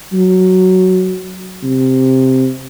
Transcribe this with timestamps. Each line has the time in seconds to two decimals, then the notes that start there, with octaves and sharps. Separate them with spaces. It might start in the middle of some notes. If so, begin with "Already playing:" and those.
0.13 F#3
1.64 C3